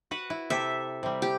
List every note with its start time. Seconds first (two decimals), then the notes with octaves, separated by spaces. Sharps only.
0.11 F#4 B4 F#5
0.30 E4
0.50 C3 G4 A4 E5
1.03 C3 G3
1.22 G4